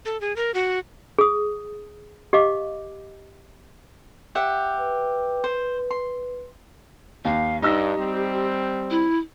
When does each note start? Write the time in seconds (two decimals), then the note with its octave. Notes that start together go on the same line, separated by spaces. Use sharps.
0.05 A4
0.21 G#4
0.36 A#4
0.54 F#4
1.19 G#4 D#6
2.33 G4 D#5 F5 D6
4.35 G4 E5 F#5
4.79 B4
5.44 C5
5.91 C6
7.25 D#2 F5
7.62 G2 D#4 G4 E6 A#6
7.97 G3 C4
8.90 E4